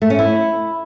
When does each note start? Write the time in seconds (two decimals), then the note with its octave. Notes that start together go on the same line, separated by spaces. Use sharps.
0.02 A3
0.10 C#4
0.19 E4